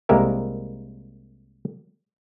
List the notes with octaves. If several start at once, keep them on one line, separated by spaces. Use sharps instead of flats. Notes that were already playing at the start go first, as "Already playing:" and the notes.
C2 G#3 A#3 G4 A#4 E5